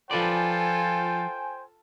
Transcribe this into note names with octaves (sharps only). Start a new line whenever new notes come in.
F3 F4 A4 B4 C5 D5 G5 G#5